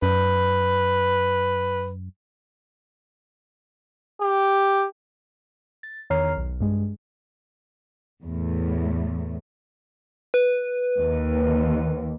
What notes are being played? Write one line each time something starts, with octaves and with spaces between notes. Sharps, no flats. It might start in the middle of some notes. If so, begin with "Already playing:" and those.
F#2 B4
G4
A6
E2 D#3 C#5 A#5 F6 C7
B1
G2 G#3
E2 A2
B4
D#2